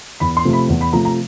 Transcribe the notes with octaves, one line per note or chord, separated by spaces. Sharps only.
E2 B5
C6
C3 F3 A3
B5
E2
B5
C3 F3 A3 A#5
A#5